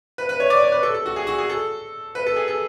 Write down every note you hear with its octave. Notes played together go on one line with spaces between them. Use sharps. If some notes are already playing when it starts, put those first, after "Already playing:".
B4
B4
C#5
D5
C#5
B4
A4
A4
F#4
G#4
F#4
G#4
A4
B4
A4
G#4
A4